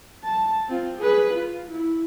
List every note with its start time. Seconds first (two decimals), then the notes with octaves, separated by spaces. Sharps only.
0.24 A5
0.68 C4 F4
0.99 G#4 B4
1.34 F4
1.71 E4